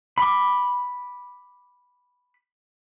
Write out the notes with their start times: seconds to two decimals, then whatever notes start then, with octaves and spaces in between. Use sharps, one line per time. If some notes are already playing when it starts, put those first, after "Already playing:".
0.18 B5 D6